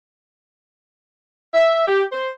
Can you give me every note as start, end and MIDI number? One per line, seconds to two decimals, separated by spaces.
1.54 1.87 76
1.88 2.03 67
2.12 2.29 72